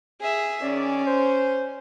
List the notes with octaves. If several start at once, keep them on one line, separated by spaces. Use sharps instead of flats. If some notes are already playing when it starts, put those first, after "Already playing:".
G#4 E5
D#3 C#4 G#4 D5
C5